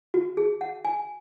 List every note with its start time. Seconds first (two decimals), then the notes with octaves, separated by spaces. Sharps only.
0.14 F#4
0.37 G#4
0.61 F#5
0.85 G#5